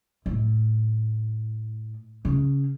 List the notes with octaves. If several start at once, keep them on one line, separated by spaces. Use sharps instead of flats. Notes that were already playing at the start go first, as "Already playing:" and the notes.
A2
C#3